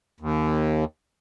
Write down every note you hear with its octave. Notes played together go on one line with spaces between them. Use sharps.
D#2